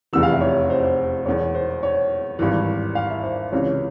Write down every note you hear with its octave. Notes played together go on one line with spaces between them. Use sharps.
F1 E2 C3 E3 E6
F5
E5
C#5
C5
C5
E1 E2 E3 C#5
C5
C#5
G#1 G2 E3
F5
E5
C5
C#2 C3 E3 C#5